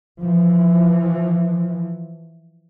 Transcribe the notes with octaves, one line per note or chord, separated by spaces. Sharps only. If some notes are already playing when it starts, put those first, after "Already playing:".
E3 F3